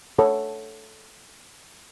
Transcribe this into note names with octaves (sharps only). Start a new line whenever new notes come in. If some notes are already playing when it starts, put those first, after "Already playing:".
A4 C#5 F#5 C#6